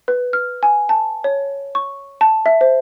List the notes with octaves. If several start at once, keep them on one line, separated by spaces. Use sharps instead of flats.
B4
F6
G#5
A5
C#5
C#6
A5
E5
C5